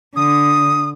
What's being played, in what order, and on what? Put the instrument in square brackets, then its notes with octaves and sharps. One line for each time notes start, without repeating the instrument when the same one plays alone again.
[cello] D3 [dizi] D#6